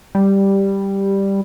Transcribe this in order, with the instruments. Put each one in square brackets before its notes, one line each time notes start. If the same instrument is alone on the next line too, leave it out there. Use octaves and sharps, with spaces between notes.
[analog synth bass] G3